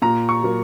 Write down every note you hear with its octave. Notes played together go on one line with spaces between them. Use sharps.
A#2 A#5
C#6
F#3 A#3